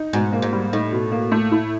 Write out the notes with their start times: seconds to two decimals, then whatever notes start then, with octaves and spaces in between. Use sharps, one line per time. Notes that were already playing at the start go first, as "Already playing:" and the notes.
Already playing: D#4
0.13 G#2 B2
0.33 A#3
0.42 G#2
0.53 G3
0.73 A2 D#4
0.92 B2
1.12 A#3
1.31 A3
1.51 E4